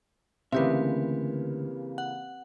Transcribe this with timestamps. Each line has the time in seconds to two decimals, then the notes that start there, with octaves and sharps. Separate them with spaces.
0.52 D2 C#3 E3 A#3 C4 G4 B4 E5
1.98 F#5